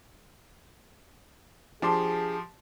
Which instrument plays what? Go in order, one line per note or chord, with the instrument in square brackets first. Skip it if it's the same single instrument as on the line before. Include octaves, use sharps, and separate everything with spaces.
[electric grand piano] F3 G4 C6 [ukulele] D4 A5 [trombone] G#4